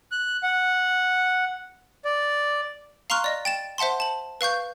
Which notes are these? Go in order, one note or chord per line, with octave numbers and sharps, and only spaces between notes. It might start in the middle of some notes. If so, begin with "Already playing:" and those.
F#6
F#5
D5
F5 A#5 C6 C#6 F6 F#6
D5 D#5
G5 A6 E7
C5 E5 F#5 A5 C6
A5 F#7
B4 F5 C#6 G6